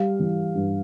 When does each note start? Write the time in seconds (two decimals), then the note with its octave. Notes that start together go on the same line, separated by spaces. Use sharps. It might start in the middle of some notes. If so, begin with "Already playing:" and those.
Already playing: G3 F5
0.19 E3
0.55 G2